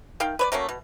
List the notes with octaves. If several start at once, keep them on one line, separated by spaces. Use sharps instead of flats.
D#3 F5 G5
B4 C#5 D5
F#3 A3 A#3 C#4
B2